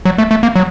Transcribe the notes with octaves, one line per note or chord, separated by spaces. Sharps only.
F#3
A3
A3
A#3
F#3